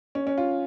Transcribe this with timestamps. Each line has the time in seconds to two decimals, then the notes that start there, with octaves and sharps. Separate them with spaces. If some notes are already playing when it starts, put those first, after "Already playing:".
0.15 C#4
0.27 C#4
0.38 F4